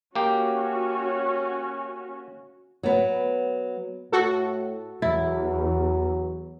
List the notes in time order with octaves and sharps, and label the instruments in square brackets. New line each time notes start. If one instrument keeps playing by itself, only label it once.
[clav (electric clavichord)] A#3 G4 [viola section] C#4 F#4
[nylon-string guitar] F#3 B3
[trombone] A2 [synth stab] F#4 A4
[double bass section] E2 [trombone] F#3 [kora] E4